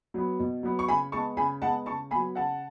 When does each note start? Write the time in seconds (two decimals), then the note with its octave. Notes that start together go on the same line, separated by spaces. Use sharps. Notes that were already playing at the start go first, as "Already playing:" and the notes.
0.14 F#3 B3
0.39 B2
0.63 F#3 B3
0.79 C#6
0.88 C#3 G#5 B5
1.12 G#3 B3 A5 C#6
1.37 C#3 G#5 B5
1.62 G#3 F#5 A5
1.66 B3
1.86 C#3 A5 C#6
2.11 B3 G#5 B5
2.15 F#3
2.35 C#3 F#5 A5